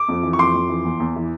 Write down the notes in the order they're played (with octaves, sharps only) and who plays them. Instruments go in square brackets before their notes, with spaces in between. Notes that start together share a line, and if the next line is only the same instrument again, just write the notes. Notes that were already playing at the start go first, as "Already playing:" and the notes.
Already playing: [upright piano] D6
F2
E3
C#6
F2 C6 D6
F2
E3
E2
E2
E3